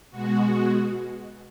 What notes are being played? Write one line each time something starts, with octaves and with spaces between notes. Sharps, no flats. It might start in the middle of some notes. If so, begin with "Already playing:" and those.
B2 G#3 F#4